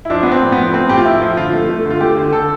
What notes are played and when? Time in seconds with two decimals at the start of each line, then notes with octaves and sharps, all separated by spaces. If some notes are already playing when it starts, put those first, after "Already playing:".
0.05 E4
0.10 F3 D4
0.23 F3 B3
0.32 C4
0.42 A2
0.52 B3
0.57 F3
0.73 A2 C4
0.89 A2 G4
0.97 F4
1.05 F3 E4
1.21 F3
1.37 D3 F4
1.53 A3
1.69 A3
1.85 D3
1.90 F4
2.01 A3 G4
2.16 D3
2.33 D3 A4